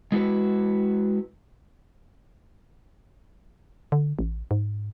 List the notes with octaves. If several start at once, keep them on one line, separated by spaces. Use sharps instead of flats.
G#3 E4 F#4 B4
D3
A1
G#2